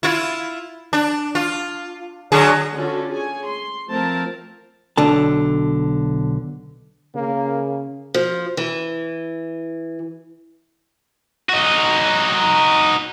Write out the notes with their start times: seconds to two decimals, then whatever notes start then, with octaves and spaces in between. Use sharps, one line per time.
0.03 E4 F4
0.93 D4
1.35 F4
2.32 D3 F#3 G#4
2.75 D3 C#4 F4 F#4 A4
3.09 G#4 C#5 G#5
3.47 C6
3.88 F3 A3 C4 A#4 A5
4.98 B1 D3 A5
7.15 C#3 A#3
8.14 F3
8.57 E3
11.49 D#4 F#4